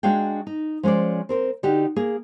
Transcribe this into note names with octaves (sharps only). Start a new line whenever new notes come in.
G#3 D4 F#4 G#4 F5 G5
D#4
F3 G#3 C#4 C5 D5
C4 A#4 C5
D3 D#4 F#4 G4
A#3 G#4